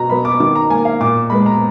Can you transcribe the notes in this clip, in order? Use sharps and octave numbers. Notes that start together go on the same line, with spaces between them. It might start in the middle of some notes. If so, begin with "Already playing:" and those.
Already playing: B2 A#5
F#3 B3 B5
D6
D#3 D6
A#5
A#3 G#5
F5
A#2 D6
G#3 B3 B5
A#5